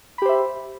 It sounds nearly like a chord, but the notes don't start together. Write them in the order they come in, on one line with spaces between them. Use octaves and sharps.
B5 G4 C5 E5